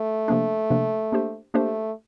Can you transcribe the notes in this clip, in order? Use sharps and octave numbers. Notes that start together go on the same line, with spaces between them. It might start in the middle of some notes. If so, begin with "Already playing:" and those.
Already playing: A3
C3 F3 A#3 D4
C3 F3 A#3 D4
A#3 D4 G4 C5
A3 A#3 D4 G4 C5